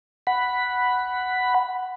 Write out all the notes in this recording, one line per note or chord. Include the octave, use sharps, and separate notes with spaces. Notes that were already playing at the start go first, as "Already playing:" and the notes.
F#5 B5